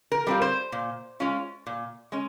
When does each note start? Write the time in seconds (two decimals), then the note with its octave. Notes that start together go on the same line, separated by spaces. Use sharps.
0.12 A#4
0.27 G3 C4 F4
0.42 C5
0.72 A#2
1.20 G#3 C#4 F4
1.66 A#2
2.12 G#3 C#4